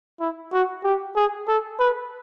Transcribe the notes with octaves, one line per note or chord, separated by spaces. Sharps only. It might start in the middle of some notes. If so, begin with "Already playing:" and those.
E4
F#4
G4
G#4
A4
B4